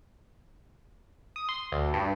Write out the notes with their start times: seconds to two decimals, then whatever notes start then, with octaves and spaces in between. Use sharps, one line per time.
1.36 D#6
1.49 C6
1.72 D2
1.94 G2